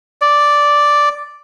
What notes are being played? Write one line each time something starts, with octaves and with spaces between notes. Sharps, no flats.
D5